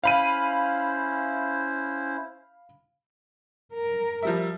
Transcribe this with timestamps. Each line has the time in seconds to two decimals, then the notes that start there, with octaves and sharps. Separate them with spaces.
0.04 C#4 E4 C5 F5 B5 D#7
3.74 A#4
4.23 F3 G3 E5